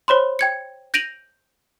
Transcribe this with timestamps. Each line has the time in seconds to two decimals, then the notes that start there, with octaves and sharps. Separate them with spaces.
0.08 C5 C#5 B5 C6
0.39 G5 G#6 C#7
0.94 G6 A#6 D7 D#7 F7 F#7